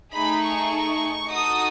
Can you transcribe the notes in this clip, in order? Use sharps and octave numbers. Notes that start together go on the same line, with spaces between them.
A3 D#4 G#4 B5
C#6
D#4 F#4 A4 D#6